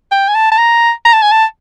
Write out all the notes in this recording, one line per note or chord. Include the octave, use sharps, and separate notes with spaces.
G5
G#5
A5
A5
A#5
A#5
A5
G#5
A5